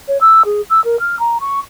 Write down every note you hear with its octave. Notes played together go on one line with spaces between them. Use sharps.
C#5
E6
G#4
E6
A#4
F6
A#5
C#6